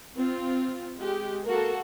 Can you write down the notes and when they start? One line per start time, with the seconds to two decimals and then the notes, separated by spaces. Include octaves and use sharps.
0.16 C4 F4
0.97 G#3 G4
1.45 A#3 F#4 A4 A#4